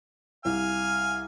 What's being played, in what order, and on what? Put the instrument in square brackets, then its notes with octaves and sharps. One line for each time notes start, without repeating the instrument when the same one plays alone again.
[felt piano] C2 [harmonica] F5 G#5 F6